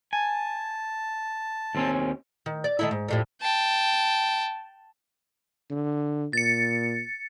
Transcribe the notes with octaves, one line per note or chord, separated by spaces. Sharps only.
G#5 A5
D#2 C4 C#4
D#3
D5
D#3 A3 E4
G#2
F2 A2 G3
G5 A5
D3
A#2 A6 C#7